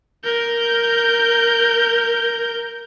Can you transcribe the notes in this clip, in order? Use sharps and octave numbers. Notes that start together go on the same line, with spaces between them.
A#4 G6